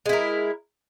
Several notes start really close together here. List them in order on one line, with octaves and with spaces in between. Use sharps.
G#3 E4 A#4